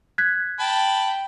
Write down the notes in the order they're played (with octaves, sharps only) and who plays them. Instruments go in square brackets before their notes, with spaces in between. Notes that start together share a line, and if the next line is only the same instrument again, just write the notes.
[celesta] F#6 G#6 B6
[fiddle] G5 [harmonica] A5 B5